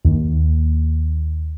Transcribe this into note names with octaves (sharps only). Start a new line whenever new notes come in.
D#2